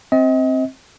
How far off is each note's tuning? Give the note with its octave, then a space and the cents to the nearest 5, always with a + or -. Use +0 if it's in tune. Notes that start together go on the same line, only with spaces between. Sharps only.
C4 +10 D#5 +35